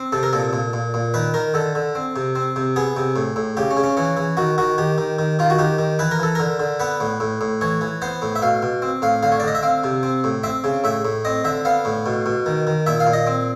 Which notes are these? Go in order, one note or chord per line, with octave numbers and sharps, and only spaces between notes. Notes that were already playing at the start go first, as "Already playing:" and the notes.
Already playing: C4
C3 A4
A#4
A#2 A4
A#2
A#2
A#2
D#3 B4
D#3 A#4
D3 A4
D3
C4
C3
C4
C3
B3 G#4
C3
A2
A2
C#3 G4
C#4
C#3
C#4
E3 C#4
E3
D#3 F#4
D#3 F#4
D#3 G4
D#3
D#3
D#3 F4
F#4
D#3 G4
D#3
E3 B4
A#4
E3 A4
D3 A#4
D3
B3 B4
A2
A2
A2
E3 C#5
E3
B3 C5
A2
E5
B2 F5
B2
C4
A2 F5
D3 F5
C#5
D5
D3 D#5
E5
C4 F5
C3
C4
A2
C4 E5
C#3
A2 E5
A2
C4 D#5
D3 E5
B3 F5
A2
B2
B2
D#3
D#3
A#2 E5
F5
A#2
D#5
C4